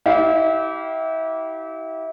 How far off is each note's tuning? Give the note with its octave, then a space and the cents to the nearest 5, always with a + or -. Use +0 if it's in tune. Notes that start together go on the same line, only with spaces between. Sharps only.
E4 -30 G4 -30 F5 +0